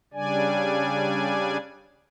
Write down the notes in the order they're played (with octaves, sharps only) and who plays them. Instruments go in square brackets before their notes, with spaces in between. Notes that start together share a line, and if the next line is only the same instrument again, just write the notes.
[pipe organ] C#3 G3 D4 D5 G#5